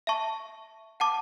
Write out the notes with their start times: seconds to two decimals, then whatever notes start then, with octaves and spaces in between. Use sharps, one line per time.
0.07 E5 A5 C#6
1.00 F#5 A5 D6